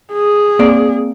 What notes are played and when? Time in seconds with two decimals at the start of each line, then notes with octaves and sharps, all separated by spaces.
0.12 G#4
0.59 A#3 C4 D5